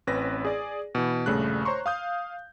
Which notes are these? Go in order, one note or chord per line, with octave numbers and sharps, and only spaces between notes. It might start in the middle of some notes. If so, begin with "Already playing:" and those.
A1 C4 C#4 B4 A#6
G#4 D5
B2 E3
A#1 G2 C#3 A3 F#6
C5 C#5 A#5 C6 C#6
F5 D#6 G6